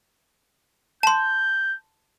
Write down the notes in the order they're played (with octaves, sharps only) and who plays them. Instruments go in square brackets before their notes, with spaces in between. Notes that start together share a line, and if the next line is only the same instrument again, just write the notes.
[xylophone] A5 C6 [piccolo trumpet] G6